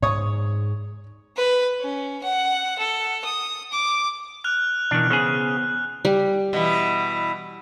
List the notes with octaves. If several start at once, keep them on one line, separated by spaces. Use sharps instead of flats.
G#2 C#5 C#6 D#6
B4
C#4
F#5
A4
D#6
D6
F6 F#6 F7
B2 D#3 E3 D4
C#3 B3 G#4 C5
G3
B2 E3